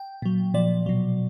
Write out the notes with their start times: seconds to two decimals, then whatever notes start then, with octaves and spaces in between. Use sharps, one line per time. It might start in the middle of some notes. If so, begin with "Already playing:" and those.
Already playing: G5
0.22 A#2 F#3
0.54 A#2 F3 D5
0.86 B2 F#3